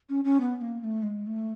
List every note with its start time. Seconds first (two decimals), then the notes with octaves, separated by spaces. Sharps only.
0.09 C#4
0.24 C#4
0.40 B3
0.56 B3
0.61 A#3
0.79 A#3
0.83 A3
1.02 G#3
1.26 A3